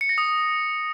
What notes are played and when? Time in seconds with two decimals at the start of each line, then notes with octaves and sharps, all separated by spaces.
0.01 C#7
0.09 A#6
0.18 D#6